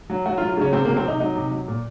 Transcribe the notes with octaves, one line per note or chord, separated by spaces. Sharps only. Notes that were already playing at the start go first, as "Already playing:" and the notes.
F#3
F#3 F#4
F4
F#3
F4
C#3 C#4
C3 C4
A#3
F#3
C4
C3 D#4
F#3 D#4
C3
F#3
A#2